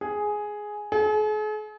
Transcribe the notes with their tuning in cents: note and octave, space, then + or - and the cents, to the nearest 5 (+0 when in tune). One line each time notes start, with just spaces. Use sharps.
G#4 +5
G#4 +45